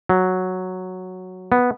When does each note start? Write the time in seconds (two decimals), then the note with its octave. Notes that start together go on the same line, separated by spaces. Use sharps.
0.09 F#3
1.52 B3